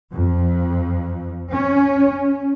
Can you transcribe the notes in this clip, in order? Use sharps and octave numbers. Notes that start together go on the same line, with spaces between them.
F2
C#4